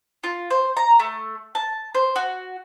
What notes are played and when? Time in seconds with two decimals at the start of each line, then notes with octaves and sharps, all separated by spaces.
0.24 F4
0.50 C5
0.77 A#5
1.00 A3
1.55 A5
1.95 C5
2.16 F#4